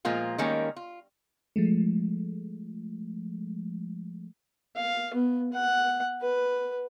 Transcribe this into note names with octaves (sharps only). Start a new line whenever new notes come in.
A#2 F3 G#3 A#3 F4
D#3 G3 G#3 A#3 C#4
F4
F3 G#3 A3
F5
B3
F#5
B4